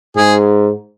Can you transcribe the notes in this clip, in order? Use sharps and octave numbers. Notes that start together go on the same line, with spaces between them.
G#2 G#4